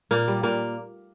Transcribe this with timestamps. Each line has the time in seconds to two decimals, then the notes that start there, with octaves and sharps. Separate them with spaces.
0.11 A#2 A#3
0.28 G3
0.43 A#2 A#3